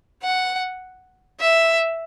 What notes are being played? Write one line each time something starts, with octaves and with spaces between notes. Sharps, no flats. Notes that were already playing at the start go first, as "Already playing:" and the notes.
F#5
E5